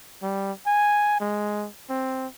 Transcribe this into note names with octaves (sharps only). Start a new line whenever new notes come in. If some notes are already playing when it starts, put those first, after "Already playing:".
G3
G#5
G#3
C4